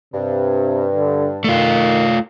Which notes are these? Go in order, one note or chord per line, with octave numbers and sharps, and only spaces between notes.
G2 C3
D3
D#3 A3 F4